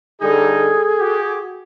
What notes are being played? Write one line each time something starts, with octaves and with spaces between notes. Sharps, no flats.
D3 G3 D#4 G#4 A4
F#4 G4